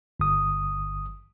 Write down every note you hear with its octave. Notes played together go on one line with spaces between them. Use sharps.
G1 D#6